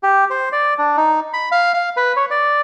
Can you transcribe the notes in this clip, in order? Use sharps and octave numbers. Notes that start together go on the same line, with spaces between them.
G4
C5
D5
D4
D#4
B5
F5
F5
B4
C#5
D5